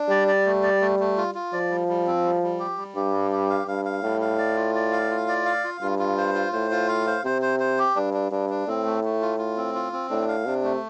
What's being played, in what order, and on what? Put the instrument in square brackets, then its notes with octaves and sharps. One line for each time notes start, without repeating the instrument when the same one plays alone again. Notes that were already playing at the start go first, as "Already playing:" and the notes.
Already playing: [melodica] D4
[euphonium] G3 [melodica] D5
[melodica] D5
A3
D5
A3
A3
F4
F4
[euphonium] F3 [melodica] D5
[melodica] G3
G3
C4
G3
G3
G4
G3
[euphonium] G2 [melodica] G4
[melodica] G3
G4
F5
[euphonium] G2 [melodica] F5
[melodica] F5
[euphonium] A2 [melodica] G3
[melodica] F5
D5
F4
D5
F5
F4
D5
F5
F4
[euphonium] G2 [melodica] F4
[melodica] F4
C5
F4
[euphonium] A2 [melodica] C5
[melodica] F4
F5
C5
[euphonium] C3 [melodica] C5
[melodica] C5
C5
G4
[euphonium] G2 [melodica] D4
[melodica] D4
[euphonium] G2 [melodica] D4
[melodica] D4
[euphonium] A2 [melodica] C4
[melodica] A3
A3
F4
F4
C4
F4
C4
[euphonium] A2 [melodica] D4
[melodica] F5
[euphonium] C3 [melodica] D4
[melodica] A3